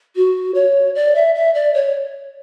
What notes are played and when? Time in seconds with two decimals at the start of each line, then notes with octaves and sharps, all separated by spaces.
0.16 F#4
0.55 C#5
0.95 D5
1.15 E5
1.35 E5
1.54 D5
1.74 C#5